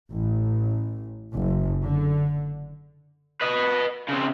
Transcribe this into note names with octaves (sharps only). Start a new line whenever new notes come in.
A1
F#1
D3
B4 D#5
C#3 C4